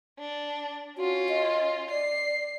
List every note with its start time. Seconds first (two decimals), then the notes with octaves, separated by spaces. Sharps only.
0.19 D4
0.98 C#4 F4 F#4
1.29 D#5
1.90 D5 C7